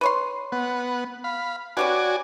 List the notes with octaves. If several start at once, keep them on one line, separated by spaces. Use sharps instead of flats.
B4 C#5 C6
B3 F#5
F5 B5
C#4 F#4 G4 B4 D5 G#5